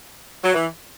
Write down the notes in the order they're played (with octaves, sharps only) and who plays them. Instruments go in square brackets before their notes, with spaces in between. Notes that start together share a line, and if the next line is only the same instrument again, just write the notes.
[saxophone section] F#3
E3